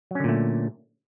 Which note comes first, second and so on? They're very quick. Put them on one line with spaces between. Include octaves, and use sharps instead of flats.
F#3 C#4 D3 A#2 A3